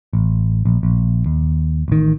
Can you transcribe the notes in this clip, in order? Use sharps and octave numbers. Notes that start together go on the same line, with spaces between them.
A1
A#1
A#1
D#2
A1 D#3